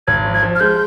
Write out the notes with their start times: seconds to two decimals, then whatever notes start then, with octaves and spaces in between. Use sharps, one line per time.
0.07 G#1 G#6
0.25 F3
0.34 G#6
0.43 F3
0.55 F6
0.60 G#3 G6